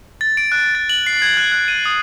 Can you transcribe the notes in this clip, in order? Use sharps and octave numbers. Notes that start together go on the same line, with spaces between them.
A6
D7
F#6
A6
F#7
C7
G#6
F#6
F#6
D#7
D#6